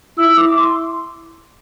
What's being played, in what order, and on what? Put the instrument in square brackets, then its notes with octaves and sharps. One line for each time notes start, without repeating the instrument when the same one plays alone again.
[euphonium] E4 [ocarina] E6
[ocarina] D6
C6